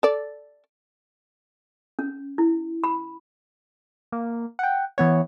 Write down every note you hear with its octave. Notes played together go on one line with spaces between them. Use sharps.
A4 D5
C#4
E4
B5
A#3
F#5 G5
E3 B3 C#5